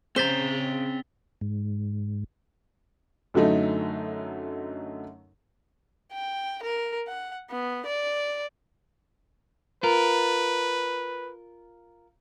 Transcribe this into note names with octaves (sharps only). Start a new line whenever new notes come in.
C#3 C4 C5 A#5 A6 B6 G7
G#2
F#2 D3 F#3 A3 D#4
G5
A#4
F#5
B3
D5
F4 A#4 B4